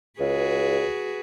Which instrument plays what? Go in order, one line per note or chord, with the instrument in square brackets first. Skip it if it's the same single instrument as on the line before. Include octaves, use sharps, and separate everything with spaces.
[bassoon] C#2 [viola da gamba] F#4 G#4 B4